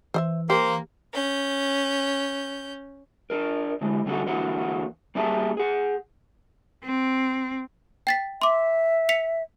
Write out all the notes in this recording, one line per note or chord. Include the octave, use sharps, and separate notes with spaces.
E3 C5 D#5 E5
A#3 G4 C5
C#4 G6
D4 A#4
D3 E3 G#3
D3 G3 C#4 F#4 A4 F#5
D3 E3 A#3 F#4 F#5
G3 A#3 C#4 G#4 E5 A5
G#4 F#5
C4
G5 A6 B6
E5 C6 D6
B6 C#7 F7